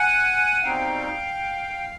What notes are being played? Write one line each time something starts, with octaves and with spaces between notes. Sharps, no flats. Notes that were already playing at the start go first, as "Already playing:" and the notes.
Already playing: F#5 G#5
B2 G3 C4 D#4 F5 G5